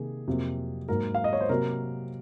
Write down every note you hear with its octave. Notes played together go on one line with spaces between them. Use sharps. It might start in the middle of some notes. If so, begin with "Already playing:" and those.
Already playing: C3 D#3 A#3 G#4
F2 C3 F#3 A#3
G#2 F#3 A#3 A#4
F5
D#5
C#5
C5
C3 F#3 A#3 A#4